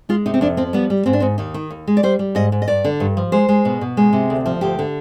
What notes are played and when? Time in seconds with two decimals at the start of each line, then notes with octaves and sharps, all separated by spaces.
0.09 G#3 F4
0.26 C3 D#4
0.34 C4
0.41 F2 D4
0.57 F3 C4
0.73 G3 B3
0.90 G3
1.06 G#2 C4
1.13 D4
1.20 G#2 C4
1.38 D#2 D#4
1.54 D#3
1.71 D#2
1.87 G#3
1.97 D5
2.03 G3 C5
2.19 G3
2.35 G#2 D#5
2.52 G#2
2.62 D#5
2.68 G2 D5
2.84 D3
3.00 G2
3.17 F3
3.32 G#3 C5
3.49 G#3
3.65 B2
3.81 B2
3.97 G#3
4.13 C3
4.30 D2
4.46 F3
4.61 D2 G4
4.79 D3